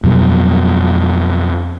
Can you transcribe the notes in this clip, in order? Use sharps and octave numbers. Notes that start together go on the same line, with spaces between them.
F2 B2 F#3 G3